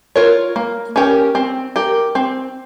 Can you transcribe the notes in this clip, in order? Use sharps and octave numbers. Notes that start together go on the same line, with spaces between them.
F4 A#4 C#5
A#3
C#4 G4 A#4
C4
G4 A#4
C4